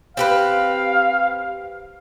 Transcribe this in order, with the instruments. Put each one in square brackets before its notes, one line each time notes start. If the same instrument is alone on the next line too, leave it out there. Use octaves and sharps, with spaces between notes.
[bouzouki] C4 G4 B4 [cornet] F5